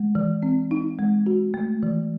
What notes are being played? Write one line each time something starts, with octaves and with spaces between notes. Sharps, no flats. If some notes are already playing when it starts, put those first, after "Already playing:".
Already playing: G#3
E3
C4
D#4
G#3
F#4
A3
E3